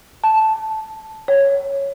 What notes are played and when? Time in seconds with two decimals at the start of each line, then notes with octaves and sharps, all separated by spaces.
0.24 A5
1.28 C#5